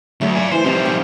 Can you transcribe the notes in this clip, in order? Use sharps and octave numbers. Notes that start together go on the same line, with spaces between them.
D2 F#3 A3
D5 G#5
E3 C5 A#5
C3 F3 G3 D#4
F3 C#4 G5